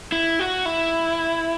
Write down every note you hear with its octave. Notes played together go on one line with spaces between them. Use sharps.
E4
F#4
E4